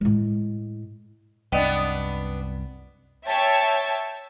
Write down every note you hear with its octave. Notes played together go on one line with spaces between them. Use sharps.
A2 G#3
C2 F#2 B3 D4 D5 D#5 G5
C#5 E5 G5 A5